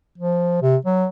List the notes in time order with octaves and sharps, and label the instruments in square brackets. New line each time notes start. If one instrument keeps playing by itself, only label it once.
[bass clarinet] F3
C3
F#3